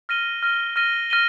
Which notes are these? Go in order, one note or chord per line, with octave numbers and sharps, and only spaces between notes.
F6 A#6 D#7 G7
F6 A#6 D#7 G7
F6 A#6 D#7 G7
F6 A#6 D#7 G7